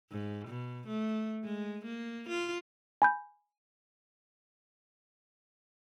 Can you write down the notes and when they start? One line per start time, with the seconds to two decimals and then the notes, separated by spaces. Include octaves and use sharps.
0.11 G#2
0.47 B2
0.87 A3
1.44 G#3
1.85 A#3
2.28 F4
3.02 G#5 B5 G6